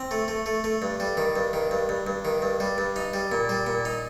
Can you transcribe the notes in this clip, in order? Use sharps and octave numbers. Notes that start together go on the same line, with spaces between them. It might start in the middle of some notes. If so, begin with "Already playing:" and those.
Already playing: C4
A3
A3
A3
A3
G2
G3
D#3
G2
D#3
G2
G2
G2
D#3
G2
G3
G2
D#4
G3
A#2
G3
A#2
D#4